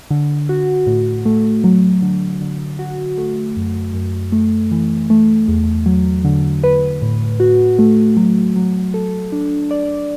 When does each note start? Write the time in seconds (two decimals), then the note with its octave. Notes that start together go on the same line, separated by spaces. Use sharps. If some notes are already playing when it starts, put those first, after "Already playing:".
0.11 D3
0.49 F#4
0.87 A2
1.25 A3
1.64 F#3
2.02 D3
2.41 D3
2.79 F#4
3.18 A3
3.57 F#2
3.94 F#2
4.32 A3
4.72 E3
5.10 A3
5.48 E2
5.86 F#3
6.25 D3
6.64 B4
7.02 A2
7.40 F#4
7.79 A3
8.17 F#3
8.56 F#3
8.94 A4
9.32 D4
9.71 D5